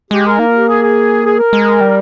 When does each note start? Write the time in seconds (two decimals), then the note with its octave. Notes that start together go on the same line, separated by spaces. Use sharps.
0.11 G#3 G4
0.25 A#4
0.36 A#3 D#4
0.46 F4
0.57 G4
0.68 G#4
0.82 G#4
1.24 G#4
1.38 A#4
1.53 G#3
1.81 G3